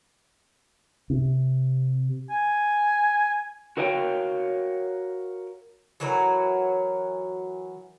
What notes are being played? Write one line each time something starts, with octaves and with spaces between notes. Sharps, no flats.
C3
G#5
F#4 A#4 C#5 F5 G5
E3 F#3 F#4 A#4